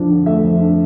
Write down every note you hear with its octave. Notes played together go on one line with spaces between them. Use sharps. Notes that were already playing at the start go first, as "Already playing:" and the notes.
Already playing: F2 F3 D4
D3
A3 E5
F2
D4